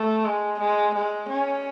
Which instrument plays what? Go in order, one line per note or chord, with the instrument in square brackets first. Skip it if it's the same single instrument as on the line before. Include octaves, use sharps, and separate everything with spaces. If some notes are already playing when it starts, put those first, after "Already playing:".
Already playing: [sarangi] A3
G#3
G#3
G#3
C#4